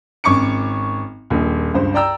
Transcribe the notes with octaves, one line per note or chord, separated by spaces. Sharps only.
G#1 C#4 C#6 D6 C#7
D#1 A#1
C#2 G2 C5
D5 G5 A#5 E6